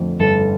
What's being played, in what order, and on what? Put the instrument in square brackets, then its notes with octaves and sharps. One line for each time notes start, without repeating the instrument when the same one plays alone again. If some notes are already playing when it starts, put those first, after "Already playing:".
Already playing: [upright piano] F2 D3 A3
[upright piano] G1 [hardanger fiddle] A4